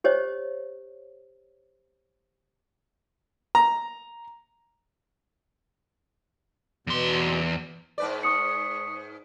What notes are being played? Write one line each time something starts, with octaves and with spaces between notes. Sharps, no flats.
G4 C5 C#5 D#5
A#5
E2 B2 C6
G#2 B4 D5
C#6 D#6 C#7